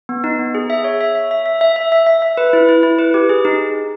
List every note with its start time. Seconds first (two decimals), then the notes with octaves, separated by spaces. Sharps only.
0.09 B3
0.24 D#4
0.39 B3
0.55 G#4
0.70 E5
0.84 C#5
1.01 E5
1.15 E5
1.31 E5
1.46 E5
1.61 E5
1.76 E5
1.92 E5
2.07 E5
2.22 E5
2.37 B4
2.53 E4
2.69 E4
2.83 E4
2.99 B4
3.14 G4
3.29 G#4
3.45 D#4